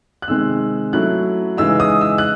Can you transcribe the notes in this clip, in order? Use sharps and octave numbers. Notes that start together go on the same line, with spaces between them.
F#6
C3 D#3 G#3 C4 E6
F#3 A3 C#4 E4 F#6
C#3 E3 G#3 D#4 E6
D#6
E6
F#6